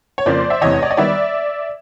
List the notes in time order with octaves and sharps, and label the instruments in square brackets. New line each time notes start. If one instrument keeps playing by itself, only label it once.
[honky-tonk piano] C#5
F2 C#3 F3 A#3 C5 D5
E5
F1 E2 C3 E3 C#5 D#5
D5
D#5
D#3 G3 B3 D5 E5